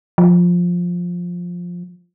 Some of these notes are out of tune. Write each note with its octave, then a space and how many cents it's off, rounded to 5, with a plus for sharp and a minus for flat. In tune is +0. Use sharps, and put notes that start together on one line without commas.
F3 +10